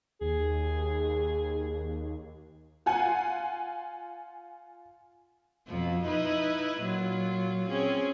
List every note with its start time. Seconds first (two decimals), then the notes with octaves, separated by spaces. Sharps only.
0.21 D#2 G#4
2.86 F4 F#5 G#5
5.67 F2 B2 F3
6.05 D#4 E4 B4
6.82 A#2 F#3 F4
7.69 C4 C#4 G#4